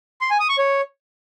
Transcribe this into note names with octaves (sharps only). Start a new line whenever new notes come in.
C6
G#5
D#6
C#6
C#5